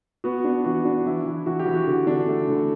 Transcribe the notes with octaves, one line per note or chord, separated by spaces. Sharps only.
B3 F#4
D4
E3 F#4
D4
E3 E4
E3
E3 F#4
G4
E3
F#4
D3
D4
A3
D3